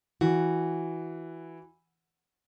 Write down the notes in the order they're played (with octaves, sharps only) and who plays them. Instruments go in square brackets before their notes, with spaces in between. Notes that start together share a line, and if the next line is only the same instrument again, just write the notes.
[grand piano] E3 [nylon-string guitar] F#4